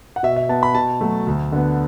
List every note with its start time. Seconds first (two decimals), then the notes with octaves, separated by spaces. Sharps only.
0.16 F#5
0.23 B2 E5
0.36 E5
0.49 B3 A5
0.63 B5
0.74 B2 A5
1.01 F#3 A3
1.27 D2
1.52 D3 B3